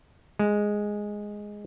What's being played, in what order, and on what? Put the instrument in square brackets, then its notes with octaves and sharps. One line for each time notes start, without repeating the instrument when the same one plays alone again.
[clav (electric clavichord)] G#3